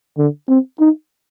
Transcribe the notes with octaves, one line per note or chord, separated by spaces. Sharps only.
D3
C4
D#4